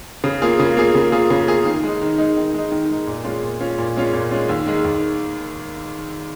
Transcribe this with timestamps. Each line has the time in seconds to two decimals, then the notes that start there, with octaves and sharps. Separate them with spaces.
0.24 C#3
0.42 A#3 F4 G#4
0.60 C#3
0.77 A#3 F4 G#4
0.95 C#3
1.12 A#3 F4 G#4
1.30 C#3
1.47 A#3 F4 G#4
1.65 D#3
1.83 G#3 D#4
2.01 D#3
2.18 G#3 D#4
2.37 D#3
2.54 G#3 D#4
2.72 D#3
2.90 G#3 D#4
3.07 A#2
3.25 G#3 C#4 F4
3.43 A#2
3.60 G#3 C#4 F4
3.78 A#2
3.96 G#3 C#4 F4
4.13 A#2
4.31 G#3 C#4 F4
4.49 D#2
4.66 D#3 G#3
4.85 D#2